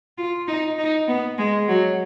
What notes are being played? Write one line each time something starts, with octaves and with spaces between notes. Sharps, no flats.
F4
D#4
D#4
B3
G#3
F#3